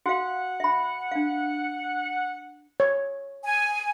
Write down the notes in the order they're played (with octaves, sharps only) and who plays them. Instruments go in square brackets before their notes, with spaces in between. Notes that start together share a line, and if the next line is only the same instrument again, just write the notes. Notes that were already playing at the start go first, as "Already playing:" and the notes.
[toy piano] F#4 F5 [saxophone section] F#5
[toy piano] E5 B5
D4 F5
[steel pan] C#5
[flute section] G#5